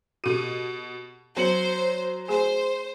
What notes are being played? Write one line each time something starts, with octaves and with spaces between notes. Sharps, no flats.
B2 F#4 G4 A4 D#7
F#3 B3 C5 C6 C#7 F#7
A3 G#4 C5 G#5